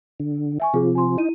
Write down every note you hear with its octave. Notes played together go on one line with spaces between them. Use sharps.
D3
E5 G#5 C#6
C3 F3 F4 G#4
G#5 C6
D#4 E4 D#7